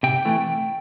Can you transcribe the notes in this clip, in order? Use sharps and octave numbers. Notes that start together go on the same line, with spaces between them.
C3 G5
E3 A3